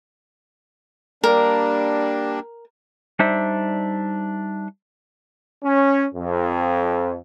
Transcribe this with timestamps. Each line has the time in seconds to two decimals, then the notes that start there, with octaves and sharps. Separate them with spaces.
1.24 G3 A#3 D4 A#4
3.19 G3 D4 D#4 C5 E5
5.64 C#4
6.15 F2